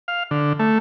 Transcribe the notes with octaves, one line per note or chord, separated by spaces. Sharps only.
F5
D3
A3